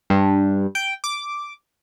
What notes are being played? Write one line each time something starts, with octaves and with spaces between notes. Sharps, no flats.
G2
G5
D6